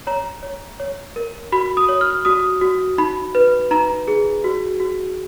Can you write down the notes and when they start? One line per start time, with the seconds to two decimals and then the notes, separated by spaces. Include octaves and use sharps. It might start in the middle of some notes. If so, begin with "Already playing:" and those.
0.07 C#5 A#5
0.43 C#5
0.80 C#5
1.16 A#4
1.52 F#4 B5
1.77 D#6
1.89 C#5
2.01 F6
2.25 F#4 D#6
2.61 F#4
2.98 D#4 B5
3.35 B4
3.71 D#4 A#5
4.08 G#4
4.44 F#4
4.80 F#4